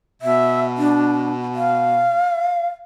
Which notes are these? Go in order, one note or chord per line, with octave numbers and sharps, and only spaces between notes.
B2 E5
D4
F5